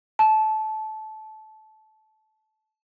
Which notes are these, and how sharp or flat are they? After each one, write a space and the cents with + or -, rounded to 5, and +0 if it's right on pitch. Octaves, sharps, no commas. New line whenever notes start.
A5 -20